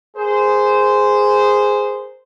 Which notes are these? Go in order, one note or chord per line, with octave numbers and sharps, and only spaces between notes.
G#4 A#4 C5